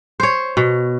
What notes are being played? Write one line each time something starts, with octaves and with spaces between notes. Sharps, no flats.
C5 C#5
B2